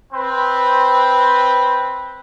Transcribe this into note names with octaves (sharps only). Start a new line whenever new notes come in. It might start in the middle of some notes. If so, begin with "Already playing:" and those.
C4 B4